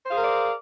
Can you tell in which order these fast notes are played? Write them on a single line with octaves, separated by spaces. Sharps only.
C5 F5 G#4 A#4 D5